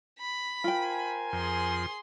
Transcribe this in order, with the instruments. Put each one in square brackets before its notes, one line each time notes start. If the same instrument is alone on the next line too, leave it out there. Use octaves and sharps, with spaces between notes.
[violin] B5
[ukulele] F4 G5 [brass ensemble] A#4 C5 G#5
[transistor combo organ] F2 [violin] G#4 C6